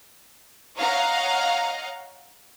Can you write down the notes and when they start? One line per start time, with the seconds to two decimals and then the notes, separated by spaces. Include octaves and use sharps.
0.77 C#5 D#5 F5 F#5 A#5